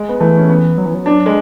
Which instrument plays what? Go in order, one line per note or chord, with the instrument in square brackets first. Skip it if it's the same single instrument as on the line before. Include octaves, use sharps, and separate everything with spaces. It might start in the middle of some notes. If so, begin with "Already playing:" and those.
Already playing: [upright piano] G#3
B3
[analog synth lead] E3 [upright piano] A3
[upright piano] C#4
B3
[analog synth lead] F#3
E3
F#3
[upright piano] D4
G#3